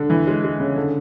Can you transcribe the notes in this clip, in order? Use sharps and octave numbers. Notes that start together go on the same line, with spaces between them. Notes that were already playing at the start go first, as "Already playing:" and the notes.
Already playing: D3
E3
G#3
G#3
C#3
D3